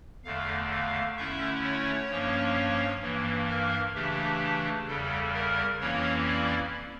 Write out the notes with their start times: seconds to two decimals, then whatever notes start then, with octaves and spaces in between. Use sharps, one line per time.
0.24 E2 D3 A3 F5
0.71 F5
1.17 D3 A3 C#4 E4 E5
1.64 C#5
2.10 G2 F3 A#3 C#4
3.02 G2 E3 A#3
3.49 A#4
3.95 C#3 E3 A3 D4 G4
4.87 E2 C#3 G3 A4
5.34 A#4
5.80 F2 E3 A#3 C#4 E4 C#5
6.27 D5